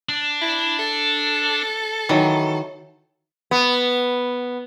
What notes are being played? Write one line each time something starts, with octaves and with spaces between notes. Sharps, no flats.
D4
E4
A4
D#3 E3 F#3
B3